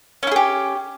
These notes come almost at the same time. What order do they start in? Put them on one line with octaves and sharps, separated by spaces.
C#4 E4 G#4 G4